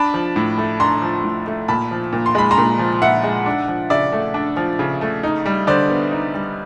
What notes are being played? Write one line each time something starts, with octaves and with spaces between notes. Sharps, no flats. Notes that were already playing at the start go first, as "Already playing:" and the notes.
Already playing: D4 A5 B5
F3
A2
A3
D4 A#5 C6
F3
A2
A3
A#2 A5 B5
F3
A#2
C6
G#3 B5
A#5 C6
A#2
F3
A#2 E5 F#5
G#3
D4
F3
C#3 D5 E5
A3
D4
F3
C#3
A3
D#4
G3
D3 C5 D5
B3
D#4
G3